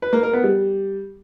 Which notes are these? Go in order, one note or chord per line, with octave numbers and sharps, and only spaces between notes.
B4
A#3
A#4
B3
G3